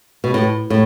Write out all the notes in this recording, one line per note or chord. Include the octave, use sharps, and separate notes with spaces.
B2
A2
A2